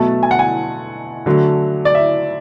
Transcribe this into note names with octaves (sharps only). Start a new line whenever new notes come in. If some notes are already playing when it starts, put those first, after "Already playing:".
Already playing: B2 F#3 A3 A5
G#5
F#5
G#5
D3 F#3 A3
D5
E5